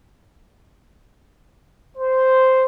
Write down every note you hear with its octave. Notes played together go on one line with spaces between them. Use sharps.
C5